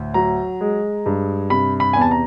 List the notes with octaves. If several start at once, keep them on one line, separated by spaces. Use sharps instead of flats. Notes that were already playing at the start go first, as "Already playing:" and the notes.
Already playing: D2 A2
F#3 A#5
G#3
G2
C3 B5
B5
E2 G#5
A5
A#5